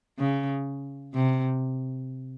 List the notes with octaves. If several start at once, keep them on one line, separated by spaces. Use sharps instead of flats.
C#3
C3